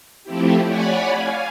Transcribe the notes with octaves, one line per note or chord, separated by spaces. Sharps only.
F3 A3 C4 E4 G4
C#5 D5 F#5 G#5 B5
F5 G#5